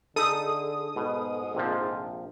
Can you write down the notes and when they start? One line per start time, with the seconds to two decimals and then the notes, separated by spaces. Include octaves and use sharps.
0.16 D3 D#4 G#4 A4 E5 D#6
0.96 G#2 B2
1.55 A#1 C3 F3